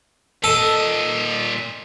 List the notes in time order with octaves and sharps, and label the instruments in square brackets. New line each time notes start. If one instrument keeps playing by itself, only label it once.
[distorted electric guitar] A#2 D#5 [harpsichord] A4